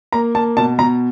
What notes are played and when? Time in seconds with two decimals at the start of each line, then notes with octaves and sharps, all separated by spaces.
0.12 A#3 A#5
0.35 A#3 A5
0.57 B2 A5
0.78 B2 A#5